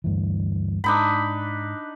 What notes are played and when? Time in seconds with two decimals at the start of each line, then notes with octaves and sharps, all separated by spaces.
0.04 D2 G2 E3
0.84 G#2 D4 D#4 B5